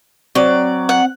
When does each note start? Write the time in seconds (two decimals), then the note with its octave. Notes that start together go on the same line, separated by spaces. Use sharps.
0.35 F#3 C4 D5
0.89 F#5